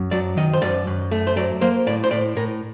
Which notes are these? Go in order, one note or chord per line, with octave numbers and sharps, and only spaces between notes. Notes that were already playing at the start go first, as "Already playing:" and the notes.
Already playing: F#2
F#3 D5
D#3 D#5
C5
F#2 D5
F#2
A3
C5
F#3 D5
A#3 C5
A2 D5
C5
A2 D5
A2 A#4